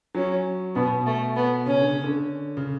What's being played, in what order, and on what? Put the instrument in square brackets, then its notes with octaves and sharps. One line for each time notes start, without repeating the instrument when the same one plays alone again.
[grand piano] F#3 [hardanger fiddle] C#4
[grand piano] B2 [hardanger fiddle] B3
[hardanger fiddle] A3
B3
[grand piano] C#3 [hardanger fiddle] C#4
[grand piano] D3
C#3
D3
C#3